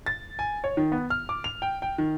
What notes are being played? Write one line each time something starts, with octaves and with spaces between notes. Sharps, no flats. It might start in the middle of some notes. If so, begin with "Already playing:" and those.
A6
G#5
C#5
D#3
B3
F6
D6
F7
G5
G5
D#3